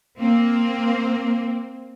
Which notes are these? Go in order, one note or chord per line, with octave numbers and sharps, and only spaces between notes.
A#3 C4